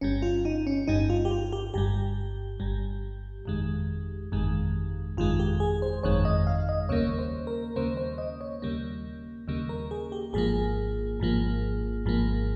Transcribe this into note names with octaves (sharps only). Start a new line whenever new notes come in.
G1 G2 G3 C#4
F4
D#4
C#4
G1 G2 G3 D#4
F4
G4
F4
G4
G1 G2 G3 G4
G1 G2 G3
G1 F2 D#3 G#3
G1 F2 D#3 G#3
G1 F2 D#3 G#3 F4
G4
G#4
C5
G1 F2 D#3 G#3 C#5
D#5
F5
D#5
D#2 C#3 G3 A#3 C#5
C5
A#4
D#2 C#3 G3 A#3 C5
C5
D#5
C#5
D#2 C#3 G3 A#3
D#2 C#3 G3 A#3
A#4
G#4
G4
G#1 G#2 F3 A#3 G#4
G#1 G#2 F3 A#3
G#1 G#2 F3 A#3